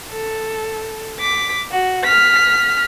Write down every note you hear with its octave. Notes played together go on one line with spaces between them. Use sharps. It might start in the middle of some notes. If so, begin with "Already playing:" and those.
A4
D6 B6
F#4
F6 B6